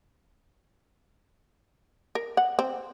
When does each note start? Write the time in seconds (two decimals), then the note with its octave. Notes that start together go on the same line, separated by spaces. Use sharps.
2.15 A#4
2.37 F#5
2.59 C4